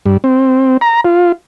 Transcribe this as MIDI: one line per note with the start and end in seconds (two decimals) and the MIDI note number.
0.06 0.17 43
0.24 0.77 60
0.81 1.01 82
1.05 1.32 65